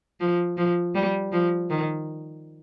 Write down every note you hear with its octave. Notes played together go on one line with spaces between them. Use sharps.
F3
F3
G3
F3
D#3